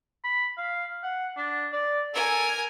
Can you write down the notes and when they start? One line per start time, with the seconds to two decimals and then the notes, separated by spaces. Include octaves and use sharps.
0.24 B5
0.57 F5
1.03 F#5
1.37 D4
1.72 D5
2.14 A4 A#4 G#5